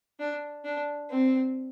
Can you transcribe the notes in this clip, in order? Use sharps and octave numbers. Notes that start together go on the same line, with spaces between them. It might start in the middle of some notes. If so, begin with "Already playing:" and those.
D4
D4
C4